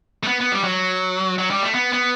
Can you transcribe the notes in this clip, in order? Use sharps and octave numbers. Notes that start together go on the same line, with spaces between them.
A3
B3
B3
G3
F#3
F#3
G3
A3
B3
B3